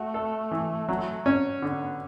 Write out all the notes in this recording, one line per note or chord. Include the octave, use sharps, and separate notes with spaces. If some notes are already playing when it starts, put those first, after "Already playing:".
Already playing: A3 F#4
A4
E3
F#3
C#4
D3 B3
B3